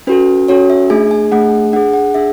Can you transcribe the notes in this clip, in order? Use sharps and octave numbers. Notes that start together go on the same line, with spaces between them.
C#4 F#4 A4 B4
C#4 F#4 A4 C#5
E5
A3 D4 G#4 G#5
G#5
A3 D4 G#4 F#5
D4 G#4 F#5
F#5
D4 G#4 E5